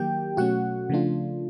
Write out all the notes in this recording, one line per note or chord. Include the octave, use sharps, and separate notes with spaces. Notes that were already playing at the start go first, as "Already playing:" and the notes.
Already playing: D#3 F#3 A#3 G4 G5
B2 F#3 A3 C#4 F#4 F#5
C#3 F3 A3 D4 F4